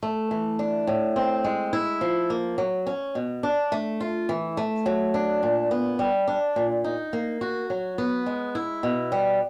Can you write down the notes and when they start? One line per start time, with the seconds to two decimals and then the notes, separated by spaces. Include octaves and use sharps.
0.03 A3
0.31 E3
0.59 D4
0.87 A2
1.16 C4
1.44 G#3
1.73 E4
2.01 F3
2.30 A#3
2.58 F#3
2.87 C#4
3.15 B2
3.43 D4
3.72 A3
4.00 F4
4.29 E3
4.57 A3
4.86 F#3
5.14 D4
5.43 A#2
5.71 B3
5.99 G3
6.28 D4
6.56 A#2
6.84 D#4
7.13 A#3
7.41 F#4
7.70 F#3
7.98 B3
8.26 G#3
8.55 E4
8.83 B2
9.12 G3